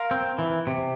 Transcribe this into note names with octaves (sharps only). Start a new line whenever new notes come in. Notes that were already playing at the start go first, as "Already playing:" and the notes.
Already playing: A#4 F5 C6
C4
E3
C3